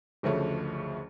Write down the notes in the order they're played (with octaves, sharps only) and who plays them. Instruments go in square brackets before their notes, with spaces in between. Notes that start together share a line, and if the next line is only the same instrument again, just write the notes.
[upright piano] F#1 D2 C#3 F3 A3 C#5